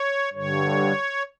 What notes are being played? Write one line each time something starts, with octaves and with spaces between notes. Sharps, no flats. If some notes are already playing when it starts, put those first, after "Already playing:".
Already playing: C#5
G2 D3 C#5